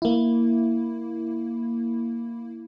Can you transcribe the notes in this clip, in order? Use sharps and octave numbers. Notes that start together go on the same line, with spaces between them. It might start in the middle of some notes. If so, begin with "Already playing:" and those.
A#3 E4